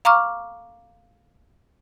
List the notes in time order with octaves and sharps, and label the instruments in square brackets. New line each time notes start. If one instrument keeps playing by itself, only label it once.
[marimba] F5 A#5 C#6 D6 F6